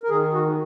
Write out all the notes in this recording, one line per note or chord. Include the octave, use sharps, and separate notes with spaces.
A#4
D#3 G#4
F#4